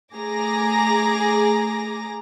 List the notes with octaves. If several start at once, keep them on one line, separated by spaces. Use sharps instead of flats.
A3 G#4 A#5 D6 A#6